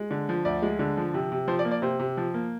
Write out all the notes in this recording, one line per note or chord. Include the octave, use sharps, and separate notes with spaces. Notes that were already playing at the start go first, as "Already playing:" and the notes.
Already playing: G#3
D3
F3
D2 D5
G#3
D3
F3
C3
C3
F3 C5
D5
A#3
D5
C3 C5
C3
F3
A#3